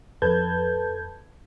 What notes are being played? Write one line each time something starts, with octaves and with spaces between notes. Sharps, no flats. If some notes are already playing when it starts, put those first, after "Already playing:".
F2 A4 B4 A5 G6 G#6